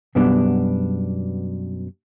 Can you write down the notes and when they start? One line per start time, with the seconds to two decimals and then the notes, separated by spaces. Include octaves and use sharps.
0.15 F#2 B2 G3 B3 D4